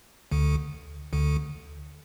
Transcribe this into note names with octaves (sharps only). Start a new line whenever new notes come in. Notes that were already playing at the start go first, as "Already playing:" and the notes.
D2 D3
D2 D3